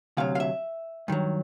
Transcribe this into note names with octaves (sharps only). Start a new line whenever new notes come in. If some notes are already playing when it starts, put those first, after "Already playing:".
D2 C3 F#3 F5
F5
E5
G2 D#3 F#3